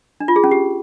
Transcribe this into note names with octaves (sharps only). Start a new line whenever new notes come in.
D4
F4
G#4
C#4
G4